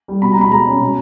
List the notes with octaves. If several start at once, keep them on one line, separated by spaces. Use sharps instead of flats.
G3
B2 B5
A#5
B2 B5
G#3 A#5
C#4
B2